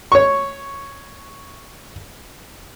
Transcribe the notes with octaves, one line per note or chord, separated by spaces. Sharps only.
C#5 C#6